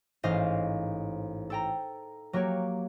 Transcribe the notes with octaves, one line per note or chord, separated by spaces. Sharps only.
A1 G#2 C5 D#5 F5 G6
A4 G5 A#5
F#3 A#3 G4 C#5